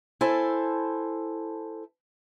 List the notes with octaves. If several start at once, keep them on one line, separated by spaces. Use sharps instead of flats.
E4 A4 C5 G#5 A5